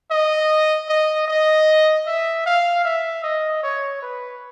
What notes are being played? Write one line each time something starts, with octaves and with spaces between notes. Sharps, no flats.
D#5
D#5
D#5
E5
F5
E5
D#5
C#5
B4